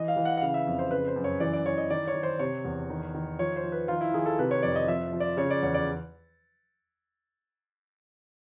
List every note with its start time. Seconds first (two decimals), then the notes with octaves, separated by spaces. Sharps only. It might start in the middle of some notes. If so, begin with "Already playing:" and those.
Already playing: E3 D#5
0.08 F5
0.16 E3
0.25 F#5
0.37 F#5
0.41 C#3 F5
0.54 E5
0.67 F2
0.79 C5
0.91 C#3 B4
1.07 C5
1.16 F#2
1.24 C#5
1.40 E3 D5
1.53 D5
1.66 E3 C#5
1.77 D#5
1.90 D#3 D5
2.07 C#5
2.15 D#3
2.23 C5
2.39 C3 C#5
2.65 E2
2.90 D#3
3.14 D#3
3.39 F3 C#5
3.56 C5
3.63 F3
3.72 B4
3.88 D#3 F4
4.01 E4
4.14 D#3 G#4
4.26 A4
4.39 C3 B4
4.51 C#5
4.63 F2 D5
4.76 D#5
4.88 F3 E5
5.13 F3
5.20 D5
5.37 C#3 C#5
5.51 D5
5.63 E2 C#5
5.74 D5